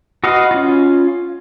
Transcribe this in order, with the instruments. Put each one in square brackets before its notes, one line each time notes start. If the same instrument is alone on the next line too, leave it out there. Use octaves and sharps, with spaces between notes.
[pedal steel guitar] F#4 B4 D#5 F5
C#4 F4